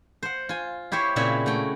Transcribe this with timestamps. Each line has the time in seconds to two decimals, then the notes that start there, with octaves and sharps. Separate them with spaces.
0.23 C5 F#5
0.49 F4 G#5
0.92 E4 G4 C5 C#5
1.16 A#2 C#3 C4 E4 C#5 E5
1.46 A3 F#4 G5